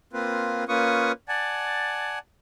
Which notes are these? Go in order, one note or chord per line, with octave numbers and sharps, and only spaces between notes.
A#3 C4 F4 B4
A#3 C#4 F4 B4 C#6 D#6
D5 F#5 G#5 A5